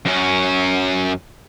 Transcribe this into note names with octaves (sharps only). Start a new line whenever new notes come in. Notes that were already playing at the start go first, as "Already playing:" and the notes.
F#2 C#4